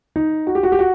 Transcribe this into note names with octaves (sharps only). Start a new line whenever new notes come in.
D#4
F#4
G4
F#4
G4
F#4